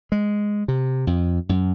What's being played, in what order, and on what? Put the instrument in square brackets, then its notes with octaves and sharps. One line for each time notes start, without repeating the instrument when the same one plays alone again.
[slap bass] G#3
C3
F2
F#2